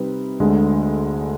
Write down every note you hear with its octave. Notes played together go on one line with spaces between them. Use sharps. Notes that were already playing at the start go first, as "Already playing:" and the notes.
Already playing: C3 G3 C4 D#4 B4
D2 D3 G#3